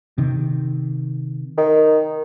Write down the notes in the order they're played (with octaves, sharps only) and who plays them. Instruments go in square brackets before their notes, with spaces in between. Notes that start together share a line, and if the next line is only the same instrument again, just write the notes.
[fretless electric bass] C3 D#3
[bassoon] D#3